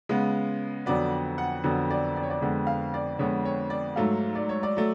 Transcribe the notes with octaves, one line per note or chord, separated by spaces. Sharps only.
C#3 G#3 B3
F2 D3 F#3 B3 D5
F#5
F2 D3 F#3 B3
D5
D5
C#5
D5
F2 D3 G#3 B3
F5
D5
F2 D3 G#3 B3 C#5
C#5
D5
G#2 F#3 A3 F5
D5
C#5
D5
F#3 A3